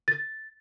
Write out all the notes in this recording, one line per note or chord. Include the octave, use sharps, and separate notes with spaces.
A6